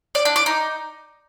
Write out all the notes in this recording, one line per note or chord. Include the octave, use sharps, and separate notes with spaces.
D5
D4
D5
D#4